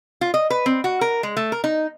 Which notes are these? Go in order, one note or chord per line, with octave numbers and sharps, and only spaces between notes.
F4
D#5
B4
C4
F#4
A#4
G#3
A3
A#4
D#4